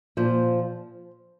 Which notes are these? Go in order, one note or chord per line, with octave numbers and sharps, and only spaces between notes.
A#2 F3 C5